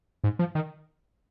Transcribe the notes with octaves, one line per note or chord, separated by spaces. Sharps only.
G#2
F3
D#3